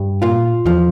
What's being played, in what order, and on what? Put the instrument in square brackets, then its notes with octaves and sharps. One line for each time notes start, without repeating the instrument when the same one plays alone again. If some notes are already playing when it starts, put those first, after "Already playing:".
Already playing: [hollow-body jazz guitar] G2
[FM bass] A#2 [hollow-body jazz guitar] F4
[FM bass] E2 [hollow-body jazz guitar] F3